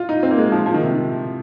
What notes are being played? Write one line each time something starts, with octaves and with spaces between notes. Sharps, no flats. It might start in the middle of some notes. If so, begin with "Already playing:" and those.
Already playing: F4
D#4
C4
A#3
G#3
F3
F3
D#3
C3
D#3